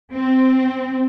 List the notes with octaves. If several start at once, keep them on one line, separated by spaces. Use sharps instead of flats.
C4